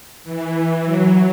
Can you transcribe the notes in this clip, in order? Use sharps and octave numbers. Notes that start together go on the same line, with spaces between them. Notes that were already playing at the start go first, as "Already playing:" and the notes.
E3
F#3